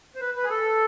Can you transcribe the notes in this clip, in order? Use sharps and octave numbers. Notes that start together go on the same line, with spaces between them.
C5
B4
B4
G#4
A4